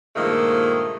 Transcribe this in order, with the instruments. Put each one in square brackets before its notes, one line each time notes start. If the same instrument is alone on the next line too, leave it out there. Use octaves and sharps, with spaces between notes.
[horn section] G2 A#2 D#3 F3 G#3 A3